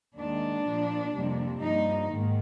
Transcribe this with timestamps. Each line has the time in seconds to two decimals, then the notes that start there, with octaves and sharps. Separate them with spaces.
0.17 D#2 D#3 G#3 D4
0.65 A#2 F3 A#3
1.14 F2 C3 G3 A#3
1.63 G2 F3 A#3 D#4
2.11 G#2 D#3 A#3